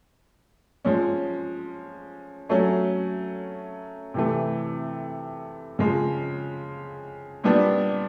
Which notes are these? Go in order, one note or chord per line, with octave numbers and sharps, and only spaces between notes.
F3 G#3 C#4
F#3 A3 C#4
C3 E3 A3
C#3 F3 G#3
A#2 G3 B3 D4